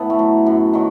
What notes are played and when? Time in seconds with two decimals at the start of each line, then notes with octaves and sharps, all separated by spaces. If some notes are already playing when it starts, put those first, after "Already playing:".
Already playing: A2 B3
0.10 A3
0.19 F#3
0.46 F#2
0.73 D#3 F#3